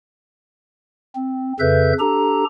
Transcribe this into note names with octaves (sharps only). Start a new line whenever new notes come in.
C4
F2 C#3 A4 B4 E5 G6
D4 G4 A4 A#5